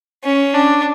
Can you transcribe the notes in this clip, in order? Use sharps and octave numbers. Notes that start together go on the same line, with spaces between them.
C#4
D4